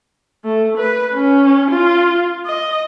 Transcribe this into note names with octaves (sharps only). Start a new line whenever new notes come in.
A3
B4
C#4
F4
D#5